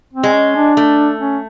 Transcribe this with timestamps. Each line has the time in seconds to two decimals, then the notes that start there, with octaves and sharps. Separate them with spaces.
0.13 C4
0.23 G#3
0.34 C#4
0.56 D4
0.77 A3
1.19 C#4